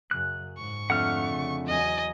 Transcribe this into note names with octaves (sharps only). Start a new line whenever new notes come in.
F#2 C#3 F#6
G#2 C#6
F2 D3 A3 F#5 F6
C#3
E2 F#3 D#5 G#5